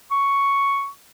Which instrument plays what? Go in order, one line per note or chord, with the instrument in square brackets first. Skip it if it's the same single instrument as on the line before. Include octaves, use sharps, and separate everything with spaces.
[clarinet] C#6